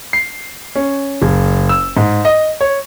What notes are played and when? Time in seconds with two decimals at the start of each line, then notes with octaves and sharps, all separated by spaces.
0.13 C7
0.75 C#4
1.22 F#1
1.69 E6
1.97 G#2
2.25 D#5
2.61 C#5